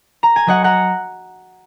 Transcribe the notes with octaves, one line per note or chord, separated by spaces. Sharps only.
A#5
G#5
F#3 D#5 F#5
F#5 A#5